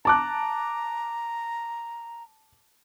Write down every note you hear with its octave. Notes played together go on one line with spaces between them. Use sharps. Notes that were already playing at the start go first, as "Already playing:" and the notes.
A5 A#5 D6 F#6